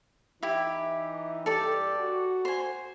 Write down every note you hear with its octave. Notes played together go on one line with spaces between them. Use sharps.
E3 D#4 E4 G4
G2 G4 A4 D5
F#4
C5 G#5